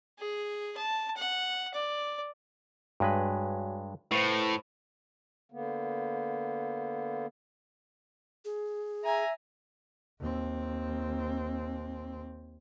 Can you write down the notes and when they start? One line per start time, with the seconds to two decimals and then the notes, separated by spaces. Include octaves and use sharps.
0.19 G#4
0.77 A5
1.17 F#5
1.74 D5
3.00 G2 G#3 F#4 B4 C#5 G#5
4.12 A2 B4 C5 F5
5.52 D3 A#3 B3
8.45 G#4
9.04 E5 G#5 A#5
10.20 D#2 C4